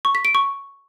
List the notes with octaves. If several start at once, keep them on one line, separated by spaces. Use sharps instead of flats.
C#6
B6
D7
C#6